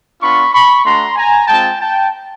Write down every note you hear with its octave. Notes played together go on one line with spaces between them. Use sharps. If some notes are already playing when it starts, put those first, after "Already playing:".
B3 D4 F4 B5 C#6
B5 C#6
A3 D4 F#4 A#5 C6
G#5 A#5
G#3 C4 F4 G5 A5
G5 A5